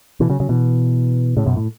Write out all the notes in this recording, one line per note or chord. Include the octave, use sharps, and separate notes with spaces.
B2 E3
C#3 F#3
C#3 F#3
B2 E3
A2 C#3
F#2 B2
A2